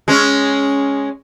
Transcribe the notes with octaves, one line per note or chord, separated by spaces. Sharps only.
G#3 C#4